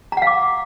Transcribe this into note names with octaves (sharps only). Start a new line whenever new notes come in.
F5 F#5 A#5 D6